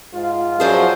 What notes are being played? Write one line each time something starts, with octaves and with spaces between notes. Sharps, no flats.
G#2 F4
F#2 F3 G#4 C5 D5